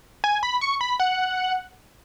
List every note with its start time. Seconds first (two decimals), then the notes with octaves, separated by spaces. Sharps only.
0.24 G#5
0.43 B5
0.61 C#6
0.81 B5
1.00 F#5